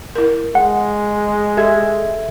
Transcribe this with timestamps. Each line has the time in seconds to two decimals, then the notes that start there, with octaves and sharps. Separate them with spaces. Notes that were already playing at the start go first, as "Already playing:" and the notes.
0.15 E4 A#4
0.55 G#3 F#5
1.57 G4 A4 E5 G#6